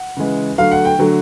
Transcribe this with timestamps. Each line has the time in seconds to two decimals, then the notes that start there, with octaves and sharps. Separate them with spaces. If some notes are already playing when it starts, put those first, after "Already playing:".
Already playing: F#5
0.17 C#3 E3 G#3
0.58 D3 F#3 A3 F5
0.72 F#5
0.85 G5
0.99 D3 F#3 A3